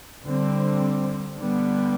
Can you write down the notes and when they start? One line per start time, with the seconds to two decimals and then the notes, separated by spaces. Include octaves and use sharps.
0.24 D3 G3 C4
1.38 D3 G3 B3